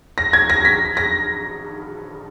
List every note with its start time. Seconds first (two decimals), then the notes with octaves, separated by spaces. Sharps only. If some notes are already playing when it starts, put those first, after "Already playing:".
0.18 A#6
0.33 G#6
0.50 A#6
0.65 B6
0.97 A#6